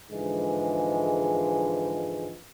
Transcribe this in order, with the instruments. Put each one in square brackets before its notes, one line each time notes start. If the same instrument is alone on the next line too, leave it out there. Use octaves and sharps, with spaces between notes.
[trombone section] G#2 D3 E3 F3 G#3